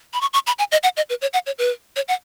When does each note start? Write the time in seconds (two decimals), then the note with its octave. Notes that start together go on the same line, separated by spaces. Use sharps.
0.13 B5
0.21 C#6
0.33 C#6
0.47 B5
0.59 G#5
0.72 D#5
0.83 F#5
0.97 D#5
1.09 B4
1.21 C#5
1.33 F#5
1.46 C#5
1.58 B4
1.96 C#5
2.08 F#5